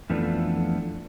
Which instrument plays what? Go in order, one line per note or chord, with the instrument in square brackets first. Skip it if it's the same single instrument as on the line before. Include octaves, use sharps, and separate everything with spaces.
[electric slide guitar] F2 E3 F3 A3 B3 D4